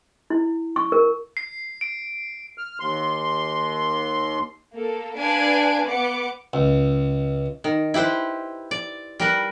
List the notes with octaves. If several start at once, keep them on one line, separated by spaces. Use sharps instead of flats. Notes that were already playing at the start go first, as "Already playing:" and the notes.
E4
C#6
A#4
C7
D7
F6
D#2 C6
A#3 A4
D4 B4 D5 F5 G#5 D7
B3 D6 C#7
C#2
D#3
E4 G4 B4 C5
D5
G3 A#4 B4